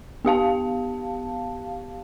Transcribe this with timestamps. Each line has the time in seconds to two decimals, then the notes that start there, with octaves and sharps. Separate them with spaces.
0.25 B3 G4 F5 A5